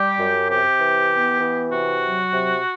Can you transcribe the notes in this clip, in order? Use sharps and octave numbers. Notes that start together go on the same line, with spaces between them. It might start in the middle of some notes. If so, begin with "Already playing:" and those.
Already playing: G3 G4
F#2
C3 G4
E3
B3
E3
C3 F#4
F#3
C3